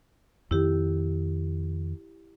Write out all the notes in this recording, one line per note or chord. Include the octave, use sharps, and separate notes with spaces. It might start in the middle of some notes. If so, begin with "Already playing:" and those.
F2 D#3 E4 G4